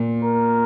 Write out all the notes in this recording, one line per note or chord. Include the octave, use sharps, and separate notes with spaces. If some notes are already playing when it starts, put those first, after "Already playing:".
Already playing: A#2
A#4